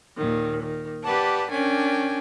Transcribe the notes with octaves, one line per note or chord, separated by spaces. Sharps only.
D#2 A#2 D#3
D#3
G4 B4 D5 F#5 A5
C#4 D4 A#4 G5 G#5